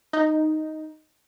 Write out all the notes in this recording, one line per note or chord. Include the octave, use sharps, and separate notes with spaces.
D#4